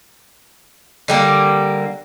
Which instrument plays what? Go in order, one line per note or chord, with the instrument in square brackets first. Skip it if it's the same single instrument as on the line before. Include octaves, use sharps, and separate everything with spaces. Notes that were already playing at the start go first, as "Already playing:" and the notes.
[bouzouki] D3 G3 A#3